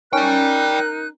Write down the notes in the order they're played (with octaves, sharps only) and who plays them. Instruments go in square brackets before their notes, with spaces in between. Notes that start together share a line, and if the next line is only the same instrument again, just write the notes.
[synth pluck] C#4 [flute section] D#4 F#6 [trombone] A#4 [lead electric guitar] D5 G5